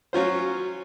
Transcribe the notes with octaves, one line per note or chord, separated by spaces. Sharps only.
F#3 C#4 F4 C5